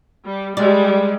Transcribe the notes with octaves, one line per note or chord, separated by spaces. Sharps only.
G3
G3 G#3 D5